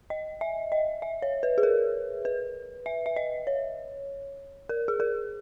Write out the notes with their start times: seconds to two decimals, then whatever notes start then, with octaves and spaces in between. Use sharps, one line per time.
0.10 D#5
0.41 E5
0.72 D#5
1.02 E5
1.22 C#5
1.43 B4
1.58 G#4
1.63 A#4
2.25 B4
2.86 E5
3.06 E5
3.16 D#5
3.47 C#5
4.69 A#4
4.88 G#4
5.00 A#4